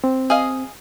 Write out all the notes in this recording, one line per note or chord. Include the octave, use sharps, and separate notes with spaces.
C4
G#4 D#5 F5